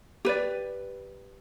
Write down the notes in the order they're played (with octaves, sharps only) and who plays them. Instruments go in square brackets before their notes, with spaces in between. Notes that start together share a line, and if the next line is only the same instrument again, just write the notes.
[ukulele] G4 B4 D5